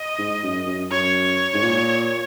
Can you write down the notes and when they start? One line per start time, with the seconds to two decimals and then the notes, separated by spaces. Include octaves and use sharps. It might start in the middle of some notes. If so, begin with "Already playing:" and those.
Already playing: D#5
0.18 G#2
0.43 F#2
0.67 F#2
0.91 F#2 C#5
1.54 G#2
1.63 A#2